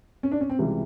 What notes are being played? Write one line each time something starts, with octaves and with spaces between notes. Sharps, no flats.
C#4
D4
C#4
C4
C#2 C3 E3 G3